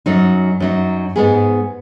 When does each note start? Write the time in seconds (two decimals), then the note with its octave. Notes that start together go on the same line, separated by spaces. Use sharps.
0.06 F#2 F#3 D#4
0.60 F#2 F#3 D#4
1.16 G#2 G#3 B3 G#4